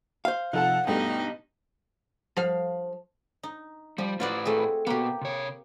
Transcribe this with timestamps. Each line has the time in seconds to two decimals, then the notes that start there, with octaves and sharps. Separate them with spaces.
0.25 C5 F5
0.53 C3 F3 D#4 A4 F#5 A5
0.87 G2 B2 G3 A3 D#4 G5
2.37 F3 F5
3.43 D#4
3.98 F3 G3
4.20 A2 F4 F#4 B4 D5
4.45 A3 C4 G#4
4.87 B2 A#3 B3 G4
5.21 C3 C#5